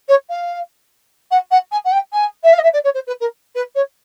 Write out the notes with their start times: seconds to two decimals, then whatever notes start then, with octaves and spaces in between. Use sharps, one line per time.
0.09 C#5
0.30 F5
1.31 F#5
1.51 F#5
1.72 G#5
1.85 F#5
1.92 G5
2.13 G#5
2.44 E5
2.53 F5
2.59 D#5
2.63 E5
2.73 D5
2.84 C#5
2.94 C5
3.07 B4
3.21 A#4
3.55 B4
3.75 C#5